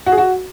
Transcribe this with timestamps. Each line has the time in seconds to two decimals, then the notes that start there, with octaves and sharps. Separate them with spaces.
0.06 F#4
0.12 G#4
0.18 F#4